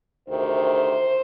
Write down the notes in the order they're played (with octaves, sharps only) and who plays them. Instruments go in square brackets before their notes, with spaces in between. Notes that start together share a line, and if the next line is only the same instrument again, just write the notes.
[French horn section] D2 C3 D#3 C5